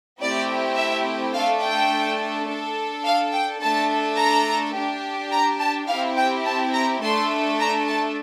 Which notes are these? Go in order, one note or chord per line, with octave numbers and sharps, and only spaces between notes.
A3 C4 E4 G4 D5
E5
A3 D4 A4 F5
G5
D4 A4
F5
G5
A3 D4 A4 A5
A#5
D4 G4
A#5
A5
C4 E4 G4 F5
G5
A5
A#5
A3 D4 A4 C6
A#5
A5